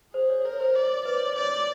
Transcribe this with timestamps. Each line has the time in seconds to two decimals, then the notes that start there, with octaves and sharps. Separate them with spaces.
0.14 G#4 C5
0.30 C#5
0.45 A#4 C#5
0.60 C5
0.76 D5
1.05 B4 D5
1.16 C#5
1.36 C#5 D5